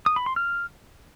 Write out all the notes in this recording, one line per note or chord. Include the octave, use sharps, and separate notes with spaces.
D#6
B5
C6
F6